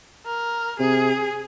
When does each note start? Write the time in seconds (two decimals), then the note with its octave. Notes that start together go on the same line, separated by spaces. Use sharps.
0.26 A#4
0.79 C3 G#4